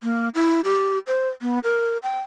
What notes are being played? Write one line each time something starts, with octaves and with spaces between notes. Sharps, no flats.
A#3
E4
G4
C5
B3
A#4
G5